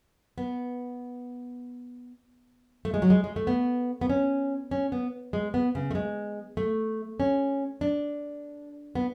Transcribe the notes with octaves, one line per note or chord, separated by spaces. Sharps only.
B3
A3
G#3
F#3
G#3
G#3
A3
B3
B3
C#4
C#4
B3
G#3
B3
C#3
A3
G#3
A3
C#4
D4
B3